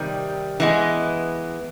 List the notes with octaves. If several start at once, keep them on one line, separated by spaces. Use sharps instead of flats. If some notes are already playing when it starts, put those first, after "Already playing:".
Already playing: C3 D#3 G3
E3 G#3 B3